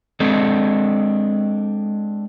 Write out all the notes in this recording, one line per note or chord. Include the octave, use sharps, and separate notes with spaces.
G#3 C4 D4 A4